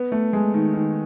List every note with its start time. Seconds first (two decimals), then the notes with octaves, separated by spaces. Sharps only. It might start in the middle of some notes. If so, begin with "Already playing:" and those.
Already playing: B3
0.12 A3
0.33 G#3
0.54 D#3
0.74 D#3